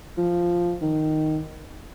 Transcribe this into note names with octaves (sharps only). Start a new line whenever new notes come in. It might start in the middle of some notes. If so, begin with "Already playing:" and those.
F3
D#3